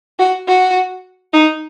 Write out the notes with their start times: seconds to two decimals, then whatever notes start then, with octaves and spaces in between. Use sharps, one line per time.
0.19 F#4
0.48 F#4
1.33 D#4